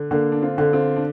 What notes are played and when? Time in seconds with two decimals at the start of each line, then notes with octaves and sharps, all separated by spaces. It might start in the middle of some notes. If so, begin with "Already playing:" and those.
Already playing: D3
0.11 D3 A#3 D4
0.32 D4
0.42 C4 F4
0.58 D3
0.73 C4 F4
0.96 D4